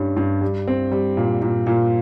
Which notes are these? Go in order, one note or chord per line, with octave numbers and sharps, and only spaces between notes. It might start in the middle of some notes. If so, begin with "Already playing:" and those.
Already playing: G2 G3 C#4
G2
G3
C4
G3
A#2
A#2
A#2